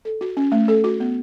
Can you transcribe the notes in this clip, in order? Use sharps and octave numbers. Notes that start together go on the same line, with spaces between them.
A4
F#4
C#4
A3
A4
F#4
B3